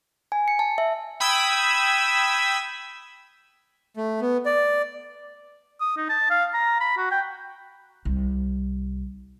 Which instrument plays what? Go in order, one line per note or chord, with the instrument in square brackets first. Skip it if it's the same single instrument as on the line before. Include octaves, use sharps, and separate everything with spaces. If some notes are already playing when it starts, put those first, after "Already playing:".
[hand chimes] G#5
C#7
A5
E5
[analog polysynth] G5 B5 D#6 E6 G#6
[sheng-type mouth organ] A3
B3
D5
[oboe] D#6
D#4
A5
F5
A#5
B5
F#4
G5
[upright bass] C2